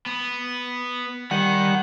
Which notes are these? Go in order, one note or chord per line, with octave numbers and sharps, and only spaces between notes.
B3
D#3 G3 F#5